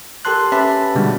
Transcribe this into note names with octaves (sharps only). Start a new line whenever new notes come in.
G4 A4 A#4 A5 C6 F#6
C#4 G4 B4 E5 A5 B5
B2 D3 G3 G#3 D4 F#4